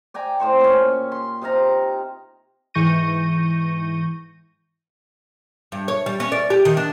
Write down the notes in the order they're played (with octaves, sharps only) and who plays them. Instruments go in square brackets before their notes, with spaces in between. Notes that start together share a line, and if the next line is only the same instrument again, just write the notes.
[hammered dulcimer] D5 G5 G#5 A#5
A2 C5 C#6
A#2 C#4
C6
C3 D#4 F5 A#5
[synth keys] G#2 E3 C#6 G6 A#6 D#7
[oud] G2
C#5
G3
C#4
D5
G4
D#3
D4